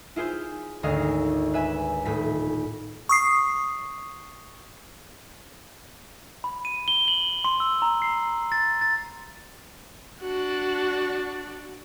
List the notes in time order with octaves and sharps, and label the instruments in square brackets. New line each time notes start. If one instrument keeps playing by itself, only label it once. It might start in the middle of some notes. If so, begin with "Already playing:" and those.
[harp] E4 F4 G#4 C5
G#1 D2 G#4 D#5 F5
B4 E5 G#5
D#1 A2 B6
[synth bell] C#6 D#6 C7
[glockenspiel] B5
D#7
G7
F#7
C6
E6
A#5
C7
A6
A6
[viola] D4 F#4